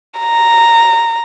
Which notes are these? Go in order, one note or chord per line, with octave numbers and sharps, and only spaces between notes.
A#5